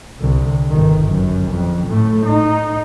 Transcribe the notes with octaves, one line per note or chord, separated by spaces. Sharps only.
C2 D3
G1 D#3
F#2
F2
A2 A3
D#4